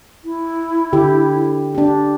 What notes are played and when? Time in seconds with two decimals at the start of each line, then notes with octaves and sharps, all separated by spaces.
0.25 E4
0.93 D3 G4
1.75 D4 G4